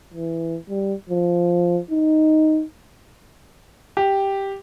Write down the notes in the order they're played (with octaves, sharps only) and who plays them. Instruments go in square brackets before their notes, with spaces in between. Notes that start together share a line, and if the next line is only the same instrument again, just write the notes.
[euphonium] E3
G3
F3
D#4
[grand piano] G4